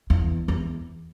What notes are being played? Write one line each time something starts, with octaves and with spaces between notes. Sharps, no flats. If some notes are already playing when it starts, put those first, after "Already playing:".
E2
E2